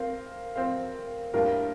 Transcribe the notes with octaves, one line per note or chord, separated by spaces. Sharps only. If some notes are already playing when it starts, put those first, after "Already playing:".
Already playing: C4 F4 A#4 C5 F5
C4 F4 C5 F5
A2 G3 A#3 D4 F4 A#4